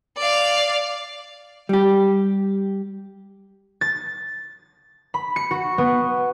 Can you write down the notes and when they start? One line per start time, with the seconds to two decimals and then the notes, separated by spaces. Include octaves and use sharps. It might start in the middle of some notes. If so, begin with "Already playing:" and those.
0.18 D5 F5
1.69 G3 G4
3.81 A6
5.14 B5
5.36 C#7
5.51 F#4
5.78 B3